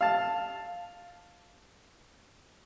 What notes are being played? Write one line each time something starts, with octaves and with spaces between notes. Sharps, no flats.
F5 A5